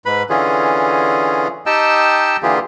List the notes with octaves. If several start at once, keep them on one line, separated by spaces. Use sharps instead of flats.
G#2 B4 B5
D3 E3 C#4 F4 G#4
D#4 G4 D#5 G5 A5 E6
D3 E3 A#3 F4 G4 G#4